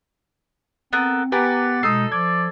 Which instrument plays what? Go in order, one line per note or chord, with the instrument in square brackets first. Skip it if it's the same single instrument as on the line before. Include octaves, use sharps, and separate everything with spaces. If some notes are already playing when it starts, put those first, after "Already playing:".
[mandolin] B3 A4 A#4 [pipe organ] C4
[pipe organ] B3 D6 A6 [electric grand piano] G4 B4 G#5 [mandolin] A#4 [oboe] F#5
[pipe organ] B2 G#3 [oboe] D#4 [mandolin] A4 [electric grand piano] D#6 C7
[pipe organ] F3 [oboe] D5 [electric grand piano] G#6